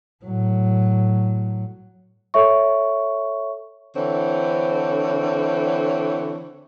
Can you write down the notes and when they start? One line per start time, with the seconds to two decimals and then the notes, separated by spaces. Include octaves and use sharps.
0.25 A2 F#3
2.34 A4 C#5 E5 C#6
3.96 D3 E3 C4 C#5